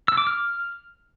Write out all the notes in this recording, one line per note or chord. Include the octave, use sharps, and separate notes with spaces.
E6
D6
F6